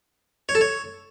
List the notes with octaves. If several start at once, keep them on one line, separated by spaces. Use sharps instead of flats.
C#5
A4
C#5